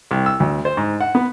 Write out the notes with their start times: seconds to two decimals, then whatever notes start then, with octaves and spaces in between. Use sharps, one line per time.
0.11 C2
0.26 E6
0.40 D2
0.65 C5
0.77 G#2
1.01 F#5
1.15 B3